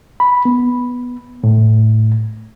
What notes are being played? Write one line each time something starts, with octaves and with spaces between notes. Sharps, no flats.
B5
B3
A2